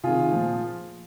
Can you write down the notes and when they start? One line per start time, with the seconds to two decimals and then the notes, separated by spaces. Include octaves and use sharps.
0.03 C3 D#3 F4 G#4
0.32 A#2 F3